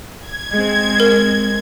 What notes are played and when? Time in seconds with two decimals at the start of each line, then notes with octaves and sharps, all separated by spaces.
0.20 G#6
0.51 G#3 C4
1.00 A#4